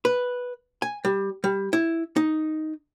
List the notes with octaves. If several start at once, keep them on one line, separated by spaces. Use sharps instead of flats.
B4
G#5
G3
G3
E4
D#4